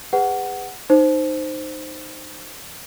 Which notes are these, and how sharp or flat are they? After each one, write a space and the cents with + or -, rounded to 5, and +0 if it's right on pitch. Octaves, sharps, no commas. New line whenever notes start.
G#4 -35 B4 +20 F#5 +10
D#4 -15 C5 +0